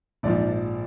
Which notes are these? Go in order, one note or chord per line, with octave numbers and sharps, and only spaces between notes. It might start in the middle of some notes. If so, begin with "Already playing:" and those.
A#1 G#2 F3 D5